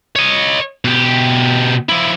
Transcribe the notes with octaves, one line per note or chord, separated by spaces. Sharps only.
C#5 D#5
B2 G4
F3 E4